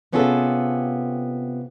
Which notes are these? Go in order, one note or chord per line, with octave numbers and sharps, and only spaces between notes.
C3 B3 C#4 F4 G#4 A4